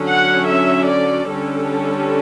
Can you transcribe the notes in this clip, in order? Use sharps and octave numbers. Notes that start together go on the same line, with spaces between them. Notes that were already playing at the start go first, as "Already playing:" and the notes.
Already playing: D3 F#3 C#4
F#5
E5
D5
D3 G3 C#4 A4